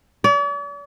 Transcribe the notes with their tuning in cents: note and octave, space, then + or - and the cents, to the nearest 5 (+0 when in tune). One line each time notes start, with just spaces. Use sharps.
D5 -45